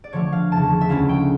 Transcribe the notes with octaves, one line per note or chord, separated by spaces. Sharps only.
D5
D3 F3 A3 C#5
F5
E2 C#3 F3 A5
E5
D2 C#3 F3 C#4 E4 F5
G5